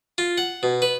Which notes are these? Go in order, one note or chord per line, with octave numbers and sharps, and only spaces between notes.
F4
F#5
B2
B4